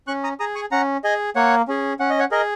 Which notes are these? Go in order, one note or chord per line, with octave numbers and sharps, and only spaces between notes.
C#4 C#6 F#6
A#5 D#6
G#4 A#5 D#6
G#5 C#6
C#4 F#5 A#5
G#4 D#5 G#5
A#3 C#5 F#5
C#4 G#4
C#4 F#5
D#5
C#5 F#5
G#4 A#4 D#5